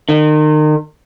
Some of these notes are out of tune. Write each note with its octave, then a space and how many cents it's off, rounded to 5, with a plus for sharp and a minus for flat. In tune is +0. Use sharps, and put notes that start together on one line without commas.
D#3 -35